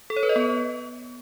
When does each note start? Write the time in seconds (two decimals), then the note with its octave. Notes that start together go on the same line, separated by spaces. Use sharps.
0.10 A4
0.16 C#5
0.23 B4
0.29 D#5
0.36 B3